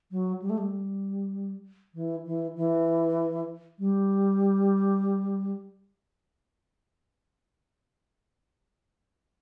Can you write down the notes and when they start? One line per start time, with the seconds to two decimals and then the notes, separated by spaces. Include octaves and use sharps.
0.11 F#3
0.42 G3
0.50 A3
0.58 G3
1.94 E3
2.26 E3
2.56 E3
3.79 G3